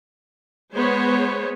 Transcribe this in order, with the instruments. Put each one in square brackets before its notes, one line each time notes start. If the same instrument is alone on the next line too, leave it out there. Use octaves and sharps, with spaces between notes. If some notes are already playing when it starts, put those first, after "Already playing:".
[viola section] G#3 B3 C5 C#5